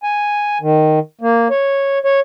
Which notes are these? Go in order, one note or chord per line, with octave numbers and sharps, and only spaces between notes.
G#5
D#3
A#3
C#5
C#5